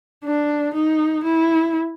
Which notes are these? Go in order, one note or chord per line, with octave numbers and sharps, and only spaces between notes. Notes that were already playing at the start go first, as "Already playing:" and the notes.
D4
D#4
E4